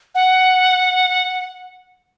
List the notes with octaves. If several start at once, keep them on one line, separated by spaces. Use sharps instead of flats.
F#5